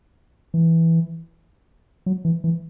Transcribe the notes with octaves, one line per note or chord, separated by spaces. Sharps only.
E3
F#3
E3
E3